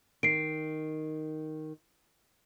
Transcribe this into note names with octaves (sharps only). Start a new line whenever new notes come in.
D#3 C7 D7